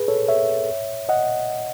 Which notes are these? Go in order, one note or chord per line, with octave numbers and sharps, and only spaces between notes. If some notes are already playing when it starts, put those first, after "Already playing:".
Already playing: G#4 B4
A4 C#5
C#5 E5
D#5 F#5